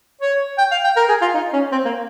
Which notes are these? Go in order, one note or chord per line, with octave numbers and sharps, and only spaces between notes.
C#5
G5
F5
G5
A#4
G#4
F4
D#4
C#4
C4
A#3